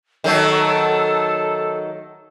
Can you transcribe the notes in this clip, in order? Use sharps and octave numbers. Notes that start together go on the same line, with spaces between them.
D#3 F#3 A3 A4